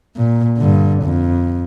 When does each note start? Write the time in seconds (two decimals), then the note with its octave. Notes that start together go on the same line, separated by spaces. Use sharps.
0.17 A#2
0.58 G2 D3
1.03 F2